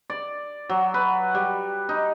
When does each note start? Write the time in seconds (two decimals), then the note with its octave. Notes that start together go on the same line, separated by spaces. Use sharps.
0.10 D5
0.69 F#3
0.94 B4
1.35 G3
1.89 D#4